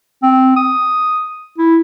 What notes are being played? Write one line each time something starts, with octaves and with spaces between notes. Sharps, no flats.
C4
D#6
E4